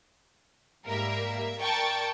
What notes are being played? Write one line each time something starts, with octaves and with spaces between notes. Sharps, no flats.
G#2 G3 A#3 A#4 E5
A#4 D5 G5 A5 C#6